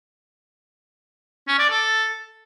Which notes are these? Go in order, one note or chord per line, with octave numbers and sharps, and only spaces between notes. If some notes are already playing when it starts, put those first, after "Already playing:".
C#4
D5
A4